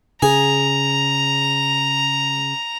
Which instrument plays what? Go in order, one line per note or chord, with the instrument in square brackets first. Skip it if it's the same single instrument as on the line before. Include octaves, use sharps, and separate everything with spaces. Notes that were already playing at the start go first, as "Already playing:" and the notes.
[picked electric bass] C#3 [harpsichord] G#4 [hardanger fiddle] A#5